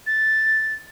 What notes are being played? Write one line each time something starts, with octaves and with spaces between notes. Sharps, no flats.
A6